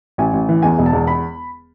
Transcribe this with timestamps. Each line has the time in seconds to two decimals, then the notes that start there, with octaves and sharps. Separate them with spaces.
0.18 A1 G#5
0.33 A1
0.49 E3
0.62 E2 G#5
0.79 E1
0.86 A5
0.93 E2
1.07 B5